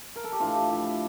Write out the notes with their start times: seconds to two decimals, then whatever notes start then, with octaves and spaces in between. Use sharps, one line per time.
0.16 A#4
0.24 A4
0.32 G4
0.40 A2 E3 D4 F4
0.55 E4 G4
0.69 A2 F3 E4 G4